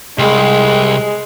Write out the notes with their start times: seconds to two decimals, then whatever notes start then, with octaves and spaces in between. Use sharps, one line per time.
0.19 C2 G#3